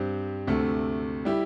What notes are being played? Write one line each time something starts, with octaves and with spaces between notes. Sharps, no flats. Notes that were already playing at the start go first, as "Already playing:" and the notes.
Already playing: G2 G3 C4
D2 C3 A3
G3 E4 G4